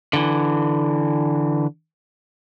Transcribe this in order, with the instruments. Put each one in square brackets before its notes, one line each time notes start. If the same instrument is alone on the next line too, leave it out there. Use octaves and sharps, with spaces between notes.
[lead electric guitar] D3 E3